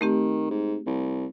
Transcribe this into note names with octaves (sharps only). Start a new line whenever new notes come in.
D#3 A3 C4 G4
G#2
C2